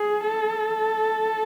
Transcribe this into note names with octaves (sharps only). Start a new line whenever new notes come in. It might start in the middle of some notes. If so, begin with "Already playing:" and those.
Already playing: G#4
A4